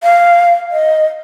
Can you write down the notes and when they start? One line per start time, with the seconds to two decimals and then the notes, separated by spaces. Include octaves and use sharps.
0.03 F5
0.71 D#5